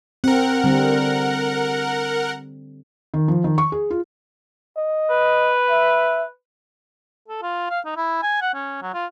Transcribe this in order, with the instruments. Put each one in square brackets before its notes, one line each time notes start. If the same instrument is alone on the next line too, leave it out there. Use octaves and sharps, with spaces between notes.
[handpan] C4 [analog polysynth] A#4 F#5
[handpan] D3 G3 C4
[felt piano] D#3
F3
D#3
C#6
G#4
F4
[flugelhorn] D#5
[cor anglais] B4
[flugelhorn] E5
[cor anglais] A4
F4
F5
D#4
E4
G#5
F#5
C#4
F#3
F4